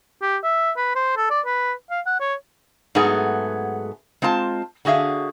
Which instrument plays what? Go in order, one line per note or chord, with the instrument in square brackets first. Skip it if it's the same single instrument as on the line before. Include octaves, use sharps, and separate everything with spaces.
[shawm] G4
E5
B4
C5
A4
D5
B4
F5
F#5
C#5
[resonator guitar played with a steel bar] G#2 F#3 A3 B3 G#4
G#3 C4 F4 A5
D3 F#4 G#4 E5 F5